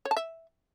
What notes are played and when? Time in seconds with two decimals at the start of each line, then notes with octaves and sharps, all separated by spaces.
0.05 C#5
0.11 A5
0.17 E5